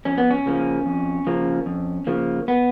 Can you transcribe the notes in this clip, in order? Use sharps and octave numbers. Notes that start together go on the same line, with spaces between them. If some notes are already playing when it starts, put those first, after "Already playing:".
F2 C#4
B3
C#4
C#3 F3 A#3
F2
C#3 F3 A#3
F2
C#3 F3 A#3
B3